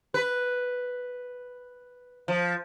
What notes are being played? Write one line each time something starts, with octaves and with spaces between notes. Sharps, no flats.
B4
F3